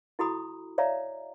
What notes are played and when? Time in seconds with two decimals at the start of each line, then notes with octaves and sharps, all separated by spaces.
0.19 E4 F#4 A4 A#5 B5 D#6
0.78 C#5 D5 E5 F5 A#5